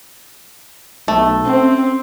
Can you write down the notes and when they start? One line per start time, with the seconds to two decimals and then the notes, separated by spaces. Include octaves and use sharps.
1.08 B1 A3
1.46 C4 C#4